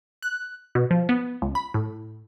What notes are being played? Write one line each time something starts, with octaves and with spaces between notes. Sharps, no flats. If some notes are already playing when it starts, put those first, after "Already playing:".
F#6
B2
F3
B3
C#2
B5
A2